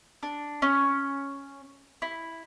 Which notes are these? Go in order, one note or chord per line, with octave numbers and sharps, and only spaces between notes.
D4
C#4
E4